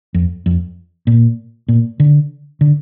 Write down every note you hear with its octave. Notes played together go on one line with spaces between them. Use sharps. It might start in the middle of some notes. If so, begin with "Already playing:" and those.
F2
F2
A#2
A#2
D3
D3